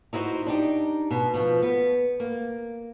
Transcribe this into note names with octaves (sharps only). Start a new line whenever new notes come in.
D#4 E4 F#4 C5
D4 D#4 G4
B2
B2 F3
B3
A#3